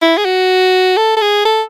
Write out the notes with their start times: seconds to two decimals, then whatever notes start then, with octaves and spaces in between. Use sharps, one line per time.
0.02 E4
0.17 G#4
0.25 F#4
0.97 A4
1.17 A4
1.21 G#4
1.45 A4